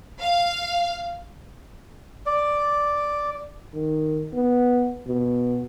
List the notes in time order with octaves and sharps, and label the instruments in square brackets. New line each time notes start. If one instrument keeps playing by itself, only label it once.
[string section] F5
[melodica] D5
[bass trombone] D#3
B3
B2